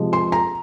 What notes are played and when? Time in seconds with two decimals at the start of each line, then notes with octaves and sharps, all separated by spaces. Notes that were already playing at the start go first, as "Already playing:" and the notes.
Already playing: C3 F3 G#3
0.13 C6
0.32 A#5